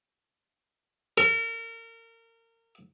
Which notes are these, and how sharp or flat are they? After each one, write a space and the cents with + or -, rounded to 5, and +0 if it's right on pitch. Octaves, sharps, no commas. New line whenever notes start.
A#4 -30